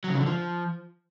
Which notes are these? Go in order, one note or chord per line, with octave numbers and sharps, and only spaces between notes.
F#3
C#3
F#3
D3
F3